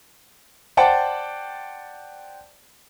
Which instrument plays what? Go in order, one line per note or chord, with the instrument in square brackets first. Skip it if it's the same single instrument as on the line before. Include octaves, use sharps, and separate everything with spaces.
[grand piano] C5 D5 F#5 G5 A5